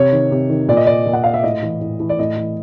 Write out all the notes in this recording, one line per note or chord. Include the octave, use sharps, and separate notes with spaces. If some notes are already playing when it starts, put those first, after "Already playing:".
Already playing: C3 C#5
D#3
C3
D#3
A#2 D5
D#5
D5
A#2
F#5
F5
E5
A2 D#5
E3
A2
E3
D5
A2 D#5
E3